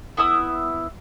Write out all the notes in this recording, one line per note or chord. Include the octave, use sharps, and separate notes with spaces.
B3 E4 E5 D#6